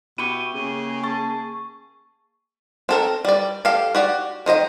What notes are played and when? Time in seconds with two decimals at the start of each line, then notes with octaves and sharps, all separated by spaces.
0.18 B2 E4 G4 C#6 D#7 G7
0.54 C#3 A#3 G#4
1.03 A5 C#6
2.89 C4 A4 A#4
3.25 G3 D5
3.65 G4 A4 F5
3.95 F#4 G4 D5
4.46 D#3 C5 D#5 G5